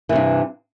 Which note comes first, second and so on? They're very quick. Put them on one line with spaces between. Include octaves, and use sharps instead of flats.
E3 C3 G2